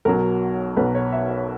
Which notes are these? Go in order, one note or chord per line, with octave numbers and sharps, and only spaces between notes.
B1 B2 F#3 A#4
B1 B2 F#3 B4
C#5
E5
C#5